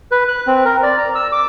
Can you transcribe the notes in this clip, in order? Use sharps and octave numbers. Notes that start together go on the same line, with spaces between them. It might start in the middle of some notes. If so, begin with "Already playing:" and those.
B4
F#6
C4
A#4
D5
A#5
E6
D6